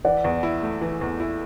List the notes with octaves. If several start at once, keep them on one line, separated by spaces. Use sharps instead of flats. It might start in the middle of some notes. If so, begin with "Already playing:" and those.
E3 D5 F#5
E2
E4
A3
E3
E2
E4